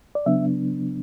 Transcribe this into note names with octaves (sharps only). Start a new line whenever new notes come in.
D5
C#3 F#3 B3 D4 E5